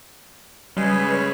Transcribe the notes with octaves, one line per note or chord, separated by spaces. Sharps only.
C#3 G3 G#3 B4 C#5